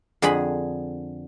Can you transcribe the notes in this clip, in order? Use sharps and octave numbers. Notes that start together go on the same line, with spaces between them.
F2 D3 G#4 G#5 B5